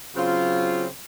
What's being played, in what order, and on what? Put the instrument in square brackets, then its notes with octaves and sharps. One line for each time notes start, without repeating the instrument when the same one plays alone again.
[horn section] C#3 F#3 C4 F4